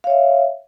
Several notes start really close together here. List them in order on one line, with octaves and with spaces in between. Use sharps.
F5 C#5 E5